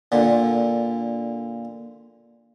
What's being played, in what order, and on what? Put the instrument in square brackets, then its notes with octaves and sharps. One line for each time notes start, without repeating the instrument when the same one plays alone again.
[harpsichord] A#2 D3